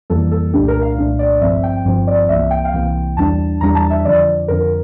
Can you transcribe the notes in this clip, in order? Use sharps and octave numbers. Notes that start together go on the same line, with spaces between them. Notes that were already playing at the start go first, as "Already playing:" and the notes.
F2 E3 G3 A#3 A4
A4
C2 A#2 A3 D4 G4
A#4
F5
C2 A#2 A3 D4
D5
G1 G2 F3 C4 E5
G5
G1 G2 F3 C4
D5
C2 C3 E3 A#3 E5
G5
F5
C2 C3 E3 A#3 G5
E2 E3 G3 D4 A5
E2 E3 G3 D4 A#5
A5
E5
F2 D3 F3 D5
F2 D3 F3 A#4